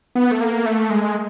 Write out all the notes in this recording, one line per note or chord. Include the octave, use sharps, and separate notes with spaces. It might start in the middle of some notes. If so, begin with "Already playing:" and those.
B3
A3
A#3
A3
G#3